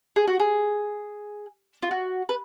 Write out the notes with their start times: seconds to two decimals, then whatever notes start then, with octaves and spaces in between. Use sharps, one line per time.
0.16 G#4
0.28 F#4
0.40 G#4
1.82 F4
1.91 F#4
2.29 B4